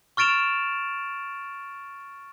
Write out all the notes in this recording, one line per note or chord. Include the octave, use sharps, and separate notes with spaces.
C#6 F6 A6 D7 E7 F7